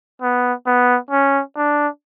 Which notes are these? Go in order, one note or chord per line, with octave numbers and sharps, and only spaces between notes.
B3
B3
C#4
D4